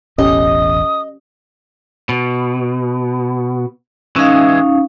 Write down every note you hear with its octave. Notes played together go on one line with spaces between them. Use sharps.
E1 A1 E2 C#4 G4 A4 D#5 D#6
B2
E3 G#3 C#4 D#4 F5